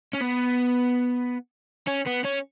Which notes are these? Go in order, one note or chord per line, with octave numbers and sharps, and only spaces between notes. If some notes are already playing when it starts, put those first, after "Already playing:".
C#4
B3
C#4
B3
C#4